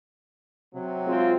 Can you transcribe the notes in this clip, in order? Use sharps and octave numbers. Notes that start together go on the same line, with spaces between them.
C3 F#3
G#3 C4 F4